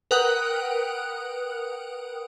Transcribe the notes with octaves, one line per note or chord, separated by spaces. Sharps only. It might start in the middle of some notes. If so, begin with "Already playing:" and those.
A#4 B4 F#5 G5 D#6 F#6